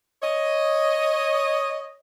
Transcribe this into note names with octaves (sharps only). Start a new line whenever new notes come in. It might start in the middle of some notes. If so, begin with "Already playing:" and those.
C#5 D#5